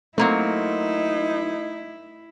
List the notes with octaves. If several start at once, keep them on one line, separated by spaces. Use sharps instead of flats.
F#3 A3 A#3 C4 D#4 E4